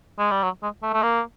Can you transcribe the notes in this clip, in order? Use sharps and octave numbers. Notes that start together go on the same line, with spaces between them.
G#3
G3
F#3
G#3
A3
A3
A#3